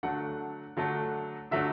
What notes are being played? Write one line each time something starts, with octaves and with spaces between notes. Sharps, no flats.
D3 F#3 A3 D4 F#5
D3 F#3 A3 D4
D3 F#3 A3 D4 E5